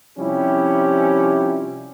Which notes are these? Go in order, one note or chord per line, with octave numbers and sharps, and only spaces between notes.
C3 F3 G3 C#4 E4 G4